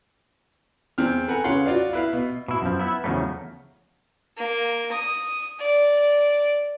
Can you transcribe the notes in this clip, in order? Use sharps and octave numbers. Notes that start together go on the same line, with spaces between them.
E2 C4 F6
A4 B4 F#5 G#5 A#5
C#3 B4 C#5 F5 F#5 C6
F4 F#4 D5 F5
E4 B4 F5
B2
B2 E4
F#2 F3
B3 E4
E2 C#3 F3 F#3 A3
A#3
D#6
D5